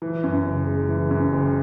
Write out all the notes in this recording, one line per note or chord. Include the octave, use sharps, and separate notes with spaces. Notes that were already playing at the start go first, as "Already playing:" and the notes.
E3
F#2
F#1
G#3
E3
F#2
F#1